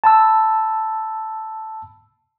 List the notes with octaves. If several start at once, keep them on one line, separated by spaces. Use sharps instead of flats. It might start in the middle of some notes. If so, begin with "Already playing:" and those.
A5 B5 E6